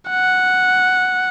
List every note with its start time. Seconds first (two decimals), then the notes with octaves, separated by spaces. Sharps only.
0.10 F#5